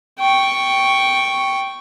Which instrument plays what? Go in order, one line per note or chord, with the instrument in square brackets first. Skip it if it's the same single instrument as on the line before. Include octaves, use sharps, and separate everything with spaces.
[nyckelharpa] G5 C#6